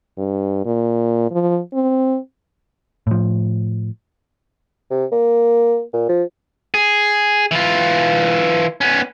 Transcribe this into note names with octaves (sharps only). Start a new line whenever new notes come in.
G2
A#2
F3
C4
A2 F3
C3
A#3
A#2
F3
G#4
E3 F4
B3 C#4